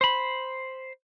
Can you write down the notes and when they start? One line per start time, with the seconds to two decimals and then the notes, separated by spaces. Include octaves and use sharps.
0.01 C5 B5